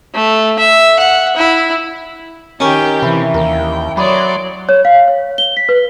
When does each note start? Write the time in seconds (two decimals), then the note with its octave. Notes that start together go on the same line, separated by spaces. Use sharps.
0.14 A3
0.59 E5
0.99 F#5
1.37 E4
2.60 D#3 C#4 G4 A#4 G5
3.02 C3 E3 E4
3.34 D#2 A#4 G5
3.97 F#3 C#5 D5 B5 C6 D6 D#6
4.69 C#5
4.85 F5
5.08 C#5
5.38 G7
5.57 B6
5.69 B4